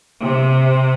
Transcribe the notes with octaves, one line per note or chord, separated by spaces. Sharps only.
C3